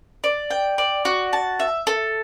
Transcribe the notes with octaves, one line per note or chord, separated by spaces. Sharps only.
D5
G5
D5
F#4
A5
E5
A4